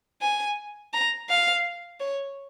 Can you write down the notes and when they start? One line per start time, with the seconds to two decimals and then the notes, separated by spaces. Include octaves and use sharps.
0.22 G#5
0.93 A#5
1.29 F5
2.00 C#5